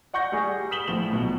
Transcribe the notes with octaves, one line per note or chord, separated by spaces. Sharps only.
D5 F#5 C#6 G6 A#6
G3 G#4
D#6 B6 E7 F#7 G7
A2 F3 E7 F#7
B1 B2